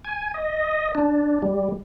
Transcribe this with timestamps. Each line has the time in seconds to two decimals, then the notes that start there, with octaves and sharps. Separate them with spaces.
0.05 G#5
0.34 D#5
0.95 D4
1.42 G3